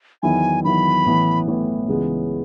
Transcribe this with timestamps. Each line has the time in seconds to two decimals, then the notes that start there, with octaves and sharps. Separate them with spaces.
0.23 E2 D#3 F#3 B3 E4 G#5
0.64 E2 D#3 F#3 B3 E4 B5
1.06 A1 A2 E3 B3
1.48 A1 A2 E3 B3
1.88 C#2 C#3 E3 G#3 B3